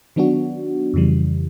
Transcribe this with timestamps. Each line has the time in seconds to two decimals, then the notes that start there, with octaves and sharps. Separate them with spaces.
0.16 D#3 F#3 B3 D4 F#4
0.94 F2 C#3 E3 G3